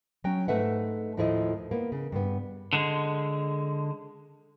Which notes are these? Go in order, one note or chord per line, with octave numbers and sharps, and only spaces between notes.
F#3 C#4 G5
G#2 E3 A3 B4 E5 F#5
D#2 A2 F3 A3 E4 D#5
A#3 B3
C#3
G2 B3
D3 G#3